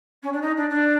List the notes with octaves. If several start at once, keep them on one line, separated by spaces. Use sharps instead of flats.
C#4
D4
D#4
D4
D4